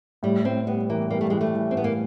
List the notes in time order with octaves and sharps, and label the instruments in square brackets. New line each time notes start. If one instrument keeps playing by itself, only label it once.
[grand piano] A2 [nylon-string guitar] G3
[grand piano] A2 [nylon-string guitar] C4
[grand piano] G3 [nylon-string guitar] B3
[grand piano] E3 [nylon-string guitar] A#3
[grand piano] G3 [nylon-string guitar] A#3
[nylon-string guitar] A3
[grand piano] E3 [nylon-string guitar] G#3
[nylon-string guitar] A3
[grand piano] E3
[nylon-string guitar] C4
[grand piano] A2 [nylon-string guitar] B3
[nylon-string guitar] A#3